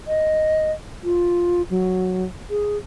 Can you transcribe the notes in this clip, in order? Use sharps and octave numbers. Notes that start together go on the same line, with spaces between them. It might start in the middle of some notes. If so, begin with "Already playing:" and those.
D#5
F4
F#3
G#4